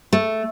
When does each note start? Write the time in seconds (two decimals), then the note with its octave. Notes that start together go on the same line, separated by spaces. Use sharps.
0.13 A3